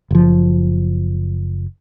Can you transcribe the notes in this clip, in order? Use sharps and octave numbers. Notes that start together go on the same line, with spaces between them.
F#1 F3